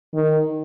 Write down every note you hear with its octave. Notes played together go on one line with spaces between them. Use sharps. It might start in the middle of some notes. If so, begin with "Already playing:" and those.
D#3